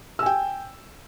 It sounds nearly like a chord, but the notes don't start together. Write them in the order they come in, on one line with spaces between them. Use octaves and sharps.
E6 G#5 G5